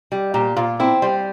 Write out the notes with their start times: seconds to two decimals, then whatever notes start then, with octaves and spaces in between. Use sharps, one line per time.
0.12 G3
0.34 A#2 G4
0.56 A#2 F4
0.80 C4 E4
1.02 G3 C5